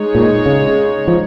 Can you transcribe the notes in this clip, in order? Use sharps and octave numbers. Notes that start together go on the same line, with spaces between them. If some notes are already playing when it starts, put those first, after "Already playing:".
Already playing: G#3 D#4 G#4 C#5
A#2
C#3
F3